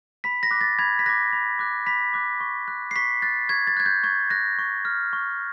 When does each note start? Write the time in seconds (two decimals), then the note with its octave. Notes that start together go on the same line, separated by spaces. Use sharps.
0.24 B5 B6
0.43 A#6
0.51 D6 F#6
0.61 A6
0.79 B5 G#6
0.99 B6
1.06 D6 F#6 A#6
1.33 B5
1.59 D6 F#6
1.86 B5 B6
2.14 D6 F#6
2.40 C#6
2.68 F#6
2.91 C7
2.96 C#6 B6
3.22 F#6 A6
3.49 C#6 G#6
3.67 A6
3.77 F#6 G#6
3.86 G6
4.03 C#6 G#6
4.30 F#6 A#6
4.59 C#6
4.85 F6
5.13 C#6